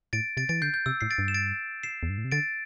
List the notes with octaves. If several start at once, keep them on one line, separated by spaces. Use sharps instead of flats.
A2 A6 D7
C3 A6 D7
E3 A6 D7
D3 G6 C7
G6
C3 E6
A2 C7
A6 D7
G2
E7
A6 D7
C7 E7
E2
G2
A2
C3
D3 A6 D7